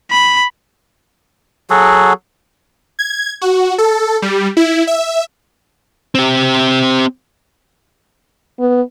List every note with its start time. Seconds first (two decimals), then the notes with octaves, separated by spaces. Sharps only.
0.11 B5
1.70 F#3 F#4 G#4 A4
2.99 G#6
3.41 F#4
3.78 A4
4.22 G3
4.57 E4
4.87 E5
6.15 C4 G4
8.59 B3